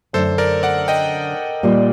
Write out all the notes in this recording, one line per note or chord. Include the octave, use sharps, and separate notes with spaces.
F#2 D3 A3 A4 C5
A#4 D5
D5 F#5
D#5 G5
A#2 G3 A#3